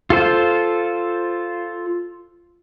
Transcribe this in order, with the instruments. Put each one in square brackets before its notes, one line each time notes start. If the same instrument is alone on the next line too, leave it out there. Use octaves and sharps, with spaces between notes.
[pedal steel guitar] F4 A4 C5